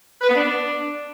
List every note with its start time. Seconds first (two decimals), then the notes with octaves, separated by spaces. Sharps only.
0.22 B4
0.29 B3
0.36 D4